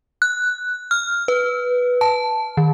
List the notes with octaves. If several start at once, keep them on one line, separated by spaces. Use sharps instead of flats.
F#6
F6
B4
A5
D#3